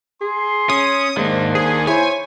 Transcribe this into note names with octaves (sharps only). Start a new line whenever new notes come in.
G#4 C6
C#4 D#6
G#2 D#3 A#3 D4 C5
G#4
E4 C5 C#5 G#5